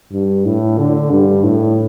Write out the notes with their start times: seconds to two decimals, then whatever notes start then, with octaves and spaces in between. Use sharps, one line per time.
0.12 G2
0.45 A2
0.78 D3
1.11 G2
1.44 A2